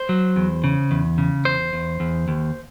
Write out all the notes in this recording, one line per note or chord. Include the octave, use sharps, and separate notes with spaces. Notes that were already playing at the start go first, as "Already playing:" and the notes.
Already playing: C5
F#3
E2
C#3
E2
C#3
E2 C5
E2
E2
D#2